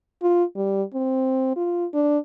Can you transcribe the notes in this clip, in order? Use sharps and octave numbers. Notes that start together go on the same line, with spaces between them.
F4
G3
C4
F4
D4